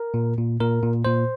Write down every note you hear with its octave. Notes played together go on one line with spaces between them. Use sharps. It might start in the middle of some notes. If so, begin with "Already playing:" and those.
Already playing: A#4
A#2
A#2
A#2 A#4
A#2
A#2 C5